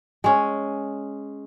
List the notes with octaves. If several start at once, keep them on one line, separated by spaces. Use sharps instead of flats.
G#3 C#4